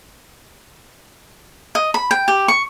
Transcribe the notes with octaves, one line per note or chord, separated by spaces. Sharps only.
D#5
B5
G5
G4
C#6